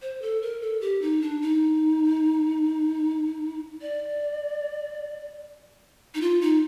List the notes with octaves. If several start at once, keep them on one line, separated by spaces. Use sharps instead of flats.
C5
A4
A#4
A4
G4
D#4
D4
D#4
D5
D#4
F4
D#4